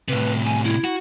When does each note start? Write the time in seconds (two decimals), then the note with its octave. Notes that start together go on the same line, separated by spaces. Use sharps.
0.09 A2 C3 B4
0.45 G#5
0.64 E4
0.84 F#4